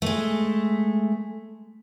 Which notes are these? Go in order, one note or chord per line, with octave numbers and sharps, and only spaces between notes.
G#3 A3